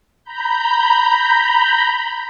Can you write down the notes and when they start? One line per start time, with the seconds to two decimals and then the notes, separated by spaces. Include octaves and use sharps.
0.24 A#5 B5 G6